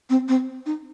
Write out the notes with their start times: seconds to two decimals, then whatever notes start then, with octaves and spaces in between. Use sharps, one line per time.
0.10 C4
0.28 C4
0.66 D#4